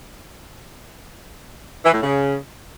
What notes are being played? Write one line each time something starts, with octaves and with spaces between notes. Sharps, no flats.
E3
A2
C#3